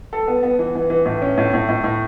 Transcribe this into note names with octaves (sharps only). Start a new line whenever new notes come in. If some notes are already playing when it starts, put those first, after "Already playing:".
A4
B3
B3
E3
E3
E3
A2
C#4
A2
A2
A2
A2